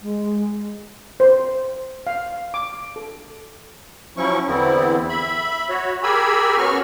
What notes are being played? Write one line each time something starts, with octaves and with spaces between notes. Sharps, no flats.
G#3
C5
F5
D6
A4
F3 F#3 C#4 E4 C#6
E2 D3 B3 C4 E4
E5 B5
F#4 C#5
G4 G#4 A#4 G#5 B5 E6
B3 C#4 F#4 C#6 F6